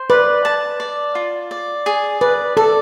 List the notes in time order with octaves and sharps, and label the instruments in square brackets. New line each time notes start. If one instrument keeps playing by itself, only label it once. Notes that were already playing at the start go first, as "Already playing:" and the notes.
Already playing: [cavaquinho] C5
[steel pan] B4 [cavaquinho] D5
[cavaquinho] A5
D5
F4
D5
G#4
[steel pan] B4 [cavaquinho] D5
[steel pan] A4 [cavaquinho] D5